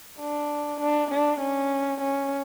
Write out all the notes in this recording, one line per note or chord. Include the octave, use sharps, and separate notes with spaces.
D4
D4
D4
C#4
C#4